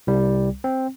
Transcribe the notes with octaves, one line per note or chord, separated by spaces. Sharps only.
C2 G3
C4